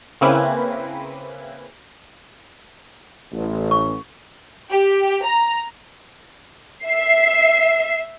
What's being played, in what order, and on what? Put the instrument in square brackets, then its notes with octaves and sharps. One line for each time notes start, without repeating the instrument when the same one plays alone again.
[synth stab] C#3 A#3 C4 C#4 E4 B4
[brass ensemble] A1
[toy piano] C#6
[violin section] G4
A#5
[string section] E5 C7